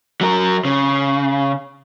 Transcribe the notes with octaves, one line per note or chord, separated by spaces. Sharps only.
F#3 A#4
C#3